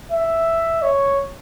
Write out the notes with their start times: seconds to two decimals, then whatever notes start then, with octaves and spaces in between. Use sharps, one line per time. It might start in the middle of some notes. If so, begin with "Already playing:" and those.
0.12 E5
0.82 C#5